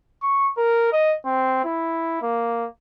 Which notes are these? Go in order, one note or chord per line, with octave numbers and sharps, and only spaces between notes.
C#6
A#4
D#5
C4
E4
A#3